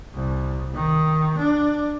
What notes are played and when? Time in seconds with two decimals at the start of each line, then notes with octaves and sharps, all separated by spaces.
0.14 C2
0.74 D#3
1.37 D4